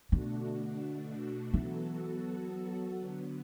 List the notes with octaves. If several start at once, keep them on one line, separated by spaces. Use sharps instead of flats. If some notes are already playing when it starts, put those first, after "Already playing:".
B2 D3 A3 D4 F#4
E3 F#3 B3 F#4 A4
D3 F#3 B3